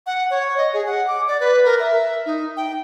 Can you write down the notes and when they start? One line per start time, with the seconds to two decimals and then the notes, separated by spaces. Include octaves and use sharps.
0.06 F#5
0.30 C#5
0.57 D#5
0.74 G#4
0.86 F#5
1.07 D6
1.28 D5
1.40 B4
1.65 A#4
1.80 E5
2.26 D#4
2.57 G5